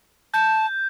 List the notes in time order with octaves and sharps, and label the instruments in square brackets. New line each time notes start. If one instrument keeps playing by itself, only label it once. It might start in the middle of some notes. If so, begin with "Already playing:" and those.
[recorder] A5 [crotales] G6